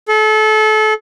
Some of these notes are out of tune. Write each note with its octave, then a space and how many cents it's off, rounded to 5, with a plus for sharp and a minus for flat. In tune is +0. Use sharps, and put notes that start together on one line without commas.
A4 -30